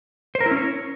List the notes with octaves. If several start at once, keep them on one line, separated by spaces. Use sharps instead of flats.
C5
A#4
E4
C#4
C#5